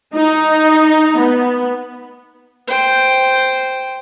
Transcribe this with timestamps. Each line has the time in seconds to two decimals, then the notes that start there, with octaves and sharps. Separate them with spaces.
0.13 D#4
1.18 B3
2.67 C5 G5